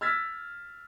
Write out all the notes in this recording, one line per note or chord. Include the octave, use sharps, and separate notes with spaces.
E6 F6 G#6 A6 B6